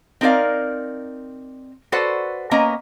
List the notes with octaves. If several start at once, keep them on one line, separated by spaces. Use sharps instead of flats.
C4 D#4 A#4 D5 F5
F#4 A4 B4 C5 D5 F#5
A#3 B3 C#4 D#5 A#5